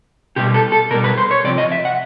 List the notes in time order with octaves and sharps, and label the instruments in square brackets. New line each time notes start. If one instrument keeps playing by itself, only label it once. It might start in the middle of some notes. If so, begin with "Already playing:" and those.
[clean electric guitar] B2 G3 G4
A4
A4
B2 A#4
G3
B4
C5
C#5
C3 F3 D5
D#5
E5
F#5